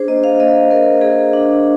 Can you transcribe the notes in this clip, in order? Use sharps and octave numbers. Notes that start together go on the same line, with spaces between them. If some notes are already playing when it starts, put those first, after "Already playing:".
Already playing: D4 G#4 C5
A#3 D#5
F5
A#3 D#5
A#3 A#4
A#3 G#4
D4